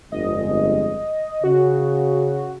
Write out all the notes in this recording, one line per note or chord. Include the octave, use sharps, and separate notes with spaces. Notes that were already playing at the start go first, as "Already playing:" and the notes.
G1 F2 G#3 D#5
C#3 F#4